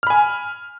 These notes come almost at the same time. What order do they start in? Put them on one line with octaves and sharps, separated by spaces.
F6 B5 G#5